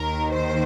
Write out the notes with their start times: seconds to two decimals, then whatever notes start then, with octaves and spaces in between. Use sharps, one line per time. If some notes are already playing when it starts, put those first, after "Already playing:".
Already playing: D#2 D#3 A#4
0.32 C5